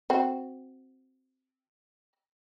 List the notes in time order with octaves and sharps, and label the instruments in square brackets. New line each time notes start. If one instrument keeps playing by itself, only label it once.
[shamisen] C4 F#4